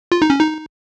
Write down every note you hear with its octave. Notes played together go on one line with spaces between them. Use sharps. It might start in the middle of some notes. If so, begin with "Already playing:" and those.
F4
D#4
C#4
D#4